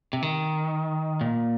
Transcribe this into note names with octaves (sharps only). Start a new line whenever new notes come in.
C3
D#3
A#2